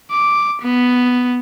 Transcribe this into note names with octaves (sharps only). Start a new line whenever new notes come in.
D6
B3